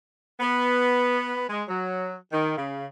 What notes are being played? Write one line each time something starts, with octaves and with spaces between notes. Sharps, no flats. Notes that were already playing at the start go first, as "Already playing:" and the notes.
B3
G#3
F#3
D#3
C#3